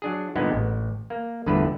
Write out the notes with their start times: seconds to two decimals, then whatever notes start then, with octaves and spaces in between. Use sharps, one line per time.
0.02 F#3 D4 G#4
0.36 G2 A#2 D3 G#3 B3 D#4
0.52 A1
1.10 A#3
1.46 G1 E2 G2 D3 A3 B4